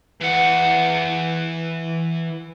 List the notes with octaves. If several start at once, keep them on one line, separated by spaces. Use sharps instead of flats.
E3 F#5